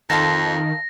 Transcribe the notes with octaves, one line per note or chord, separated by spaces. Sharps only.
F2 D#3 A4 F5 C6 A#6